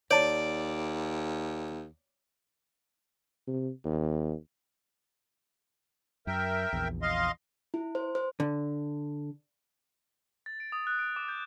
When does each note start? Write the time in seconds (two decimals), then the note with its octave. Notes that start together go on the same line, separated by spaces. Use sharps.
0.11 D#2 C#5 D5 A5
3.47 C3
3.84 D#2
6.27 F#2 A#4 E5 G5
6.73 A#1 E2
7.02 D#5 F5 C6
7.74 E4
7.95 C5
8.15 C5
8.40 D3
10.46 A6
10.60 D7
10.72 D#6
10.87 F#6
10.99 D7
11.16 D6
11.29 G6